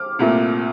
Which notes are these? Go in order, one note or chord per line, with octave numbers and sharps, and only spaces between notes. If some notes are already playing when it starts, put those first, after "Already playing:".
Already playing: D6 F6
C2 A#2 A3